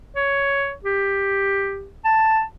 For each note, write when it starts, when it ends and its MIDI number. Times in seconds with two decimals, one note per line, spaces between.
0.16 0.73 73
0.85 1.89 67
2.05 2.42 81